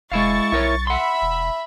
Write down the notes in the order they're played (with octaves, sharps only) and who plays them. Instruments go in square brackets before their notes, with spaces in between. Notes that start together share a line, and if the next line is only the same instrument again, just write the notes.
[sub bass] E1 [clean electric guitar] G#3 E4 F5 [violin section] C#6 A6
[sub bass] B1 [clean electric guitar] E4 A#4 C#5
[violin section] E5 B5 [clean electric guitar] F#5 C6
[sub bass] E1